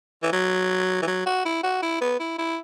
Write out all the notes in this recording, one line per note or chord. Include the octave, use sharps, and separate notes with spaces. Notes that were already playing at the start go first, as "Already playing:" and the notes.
E3
F#3
E3
F#3
F#4
E4
F#4
E4
B3
E4
E4